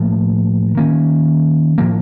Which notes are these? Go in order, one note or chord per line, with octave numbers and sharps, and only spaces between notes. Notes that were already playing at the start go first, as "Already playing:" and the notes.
Already playing: A2 F3 A#3
D#3 A#3 C#4
A2 F3 A#3